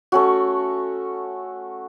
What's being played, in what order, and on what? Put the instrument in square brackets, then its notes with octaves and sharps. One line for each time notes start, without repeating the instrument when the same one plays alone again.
[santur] A3 C#4 F#4